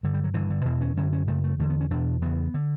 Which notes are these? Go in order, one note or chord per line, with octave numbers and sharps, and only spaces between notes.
G2 D3
G3
F#3
G2 D3 E3
D3
E2 B2 E3
C#4
F#2 D3 C#4
C#4
F#2 C#3 A3
A3
E2 D3 A3
B3
C#4
E2 B2 D4
E2 C#3 B3
D3